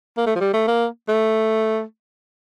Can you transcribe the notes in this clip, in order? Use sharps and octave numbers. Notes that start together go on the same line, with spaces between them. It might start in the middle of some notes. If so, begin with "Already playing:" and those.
A#3
A3
F3
G3
A3
A#3
A3